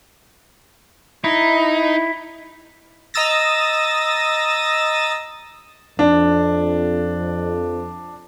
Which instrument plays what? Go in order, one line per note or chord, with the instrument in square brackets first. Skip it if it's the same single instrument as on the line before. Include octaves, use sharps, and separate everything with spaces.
[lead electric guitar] D#4 [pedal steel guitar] E4
[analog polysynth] D#5 A#5 D#6 E6 A6 A#6
[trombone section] F2 [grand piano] D4